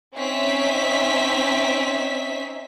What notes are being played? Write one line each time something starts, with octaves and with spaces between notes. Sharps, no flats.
C4 C#4 D#4 D#5 E5 B6